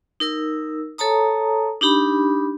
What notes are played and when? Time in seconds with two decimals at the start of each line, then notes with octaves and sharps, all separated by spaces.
0.20 D#4 A#4 E6
0.98 A4 C#5 A5 A#5 D#6
1.81 D4 D#4 G4 B5